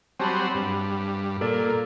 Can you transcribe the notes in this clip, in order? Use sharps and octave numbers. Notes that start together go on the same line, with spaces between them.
F#3 G3 C4 G#5 A5 B5
G2
A#2 A4 D5